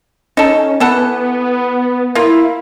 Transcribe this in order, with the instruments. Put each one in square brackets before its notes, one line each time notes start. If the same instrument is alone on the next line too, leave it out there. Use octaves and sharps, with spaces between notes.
[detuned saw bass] C#4 [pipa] D#4 A4
[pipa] E3 A4 F#5 [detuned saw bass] B3
[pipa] A#3 F4 [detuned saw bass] E4